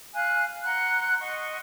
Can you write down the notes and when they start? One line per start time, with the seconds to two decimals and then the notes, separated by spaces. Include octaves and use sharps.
0.14 F5 G#5 F#6
0.64 F#5 A#5 C6 F#6
1.20 D#5 F#5 C6 C#6